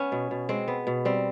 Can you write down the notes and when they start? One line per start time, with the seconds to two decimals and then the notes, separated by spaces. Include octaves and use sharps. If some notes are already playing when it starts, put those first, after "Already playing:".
Already playing: B3 C#4
0.12 B2
0.31 B2
0.49 G#3 C4
0.68 B3
0.87 B2
1.05 G3 C4